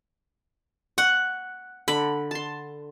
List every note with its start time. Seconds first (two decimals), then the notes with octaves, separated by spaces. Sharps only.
0.98 F#5 C#6
1.88 D3 B5
2.31 A5 C6